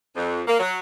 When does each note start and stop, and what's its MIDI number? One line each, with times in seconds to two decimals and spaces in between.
0.16 0.41 41
0.48 0.57 58
0.59 0.79 54